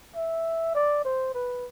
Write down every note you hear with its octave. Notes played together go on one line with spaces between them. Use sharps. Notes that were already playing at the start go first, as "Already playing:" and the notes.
E5
D5
C5
B4